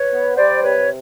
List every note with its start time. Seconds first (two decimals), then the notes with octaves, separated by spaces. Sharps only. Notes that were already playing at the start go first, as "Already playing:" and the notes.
Already playing: B4 C#5
0.11 B3
0.36 G3 C5 D5
0.62 C3 B4 C#5